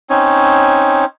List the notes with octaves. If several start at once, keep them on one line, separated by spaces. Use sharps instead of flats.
C4 C#4 D#4 C#5